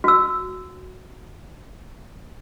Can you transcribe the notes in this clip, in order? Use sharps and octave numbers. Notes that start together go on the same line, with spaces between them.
F#4 E6